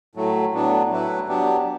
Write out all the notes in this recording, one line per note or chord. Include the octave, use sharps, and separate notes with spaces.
A2 F#3 A3
A2 F#3 B3 D4
A2 F#3 A3 E4 B4
F#3 B3 D4 G4